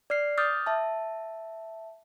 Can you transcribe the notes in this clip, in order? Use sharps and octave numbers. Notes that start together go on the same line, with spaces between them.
D5 F6 C7
D6 D#6 F6 G6 A6
E5 A5